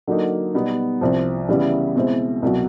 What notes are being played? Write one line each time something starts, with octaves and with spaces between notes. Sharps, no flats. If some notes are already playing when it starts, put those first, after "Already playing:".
D3 F#3 A#3 D#4
B2 G3 B3 D#4
C2 C3 F3
C#3 E3 G3 B3 E4
B2 G#3 C4 E4
C2 B2 F#3